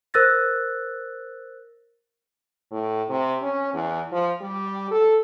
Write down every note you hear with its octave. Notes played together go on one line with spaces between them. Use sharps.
A#4 C5 E6 F#6 A6 A#6
A2
C3
C#4
E2
F3
G3
A4